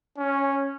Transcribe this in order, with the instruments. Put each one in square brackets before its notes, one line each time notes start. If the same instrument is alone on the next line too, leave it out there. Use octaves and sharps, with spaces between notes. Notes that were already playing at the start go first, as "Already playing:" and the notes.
[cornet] C#4